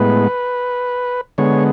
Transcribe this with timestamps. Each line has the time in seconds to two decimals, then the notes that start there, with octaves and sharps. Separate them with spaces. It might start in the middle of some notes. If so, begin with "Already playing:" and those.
Already playing: A2 G#3 B3 B4
1.38 D3 G#3 B3 C#5